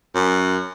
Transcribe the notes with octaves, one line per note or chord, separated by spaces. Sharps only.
F#2